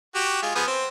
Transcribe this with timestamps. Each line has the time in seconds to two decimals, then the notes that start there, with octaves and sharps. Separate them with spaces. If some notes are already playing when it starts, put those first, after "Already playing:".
0.15 F#4 G4
0.42 G#3 F4
0.55 F3 B3 G#4
0.67 C4